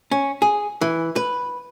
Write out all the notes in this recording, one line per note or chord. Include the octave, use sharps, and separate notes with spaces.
C#4
G#4
E3
B4